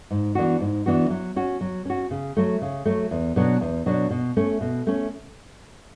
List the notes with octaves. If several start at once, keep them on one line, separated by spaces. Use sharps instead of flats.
G#2
E3 B3 D4 F#4
G#2
E3 B3 D4 F#4
F#3
C#4 F#4
F#3
C#4 F#4
C#3
F#3 A3
C#3
F#3 A3
E2
B2 F#3 B3 D4
E2
B2 F#3 B3 D4
B2
A3 C#4
B2
A3 C#4